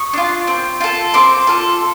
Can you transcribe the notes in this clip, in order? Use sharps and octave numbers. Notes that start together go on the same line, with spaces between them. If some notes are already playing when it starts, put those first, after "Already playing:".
Already playing: C#6 D#6
D4 F4
C4
F4 A4
C4 C6 D6
F4 A4